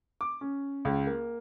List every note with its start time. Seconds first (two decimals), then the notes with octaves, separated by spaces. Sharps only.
0.21 D6
0.41 C#4
0.85 C#2
1.07 A#3